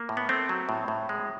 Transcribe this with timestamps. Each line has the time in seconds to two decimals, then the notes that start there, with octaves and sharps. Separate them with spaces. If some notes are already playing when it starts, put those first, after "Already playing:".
Already playing: A#3
0.09 A2
0.17 B3
0.29 A3 C4
0.49 F#3
0.69 A2
0.88 A2
1.09 G#3